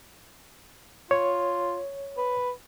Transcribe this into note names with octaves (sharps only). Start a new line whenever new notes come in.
F4 C#5
B4